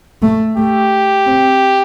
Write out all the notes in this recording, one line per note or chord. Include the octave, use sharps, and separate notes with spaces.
A3
A3 G4
C4